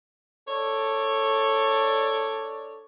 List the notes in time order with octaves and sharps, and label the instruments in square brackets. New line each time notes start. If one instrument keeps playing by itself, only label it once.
[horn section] D4 A4 C#5 D5